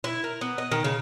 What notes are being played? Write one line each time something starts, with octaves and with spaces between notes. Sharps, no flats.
E4
A#4
B3
D#5
D#3
C#3